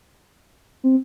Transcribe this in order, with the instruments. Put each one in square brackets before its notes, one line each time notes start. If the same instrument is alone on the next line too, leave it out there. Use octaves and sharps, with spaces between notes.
[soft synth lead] C4